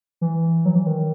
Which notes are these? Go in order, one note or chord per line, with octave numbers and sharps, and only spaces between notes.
E3
F#3
E3
D#3